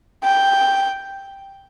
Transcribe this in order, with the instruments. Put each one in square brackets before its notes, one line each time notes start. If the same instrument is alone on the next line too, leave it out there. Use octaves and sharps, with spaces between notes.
[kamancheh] G5